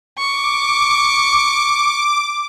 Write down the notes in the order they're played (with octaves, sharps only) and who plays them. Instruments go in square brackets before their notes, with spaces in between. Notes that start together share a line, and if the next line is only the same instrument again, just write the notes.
[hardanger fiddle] C#6 [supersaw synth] D6